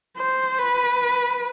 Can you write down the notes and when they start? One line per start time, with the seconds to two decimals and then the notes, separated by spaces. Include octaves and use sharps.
0.17 C5
0.58 B4